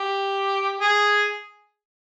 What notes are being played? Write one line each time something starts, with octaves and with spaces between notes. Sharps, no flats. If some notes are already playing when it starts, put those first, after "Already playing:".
Already playing: G4
G#4